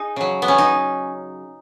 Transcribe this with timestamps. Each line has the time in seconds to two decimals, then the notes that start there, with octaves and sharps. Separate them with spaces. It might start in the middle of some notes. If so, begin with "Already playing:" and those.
Already playing: D#4 G#4
0.16 C#3 F#3
0.42 B3
0.48 C#4
0.58 D#4